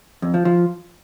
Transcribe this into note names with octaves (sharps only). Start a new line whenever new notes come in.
F2
F3
F3